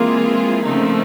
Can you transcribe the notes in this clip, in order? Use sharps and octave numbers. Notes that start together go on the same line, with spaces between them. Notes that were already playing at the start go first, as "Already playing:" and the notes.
Already playing: E3 G#3 A#3 C4 F4 G#4
C#3 F3 A3 C4 D#4